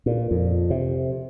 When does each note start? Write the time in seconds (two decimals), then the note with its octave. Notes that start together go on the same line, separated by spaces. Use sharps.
0.06 A#2
0.31 F2
0.70 C3